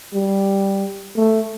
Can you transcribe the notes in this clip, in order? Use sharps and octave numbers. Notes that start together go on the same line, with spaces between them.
G3
A3